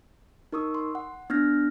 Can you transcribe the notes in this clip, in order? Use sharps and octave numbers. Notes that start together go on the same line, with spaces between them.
D#4 A#4 C#6 D#6 E6
C6
F#5
B3 D4 F6 G6 A#6